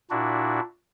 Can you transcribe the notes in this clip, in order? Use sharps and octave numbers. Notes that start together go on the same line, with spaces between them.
A#2 D4 E4 F#4